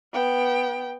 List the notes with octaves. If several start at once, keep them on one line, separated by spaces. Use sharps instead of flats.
B3 G5